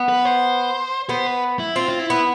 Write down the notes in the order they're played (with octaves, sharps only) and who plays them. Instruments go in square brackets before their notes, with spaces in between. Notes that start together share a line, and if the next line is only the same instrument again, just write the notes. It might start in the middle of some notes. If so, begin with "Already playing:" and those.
Already playing: [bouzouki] B3
[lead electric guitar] B4
C5
[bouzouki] B3 [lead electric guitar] C5
[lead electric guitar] B4
E4
[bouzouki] C4 [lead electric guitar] F4
[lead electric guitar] F4
E4
[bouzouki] B3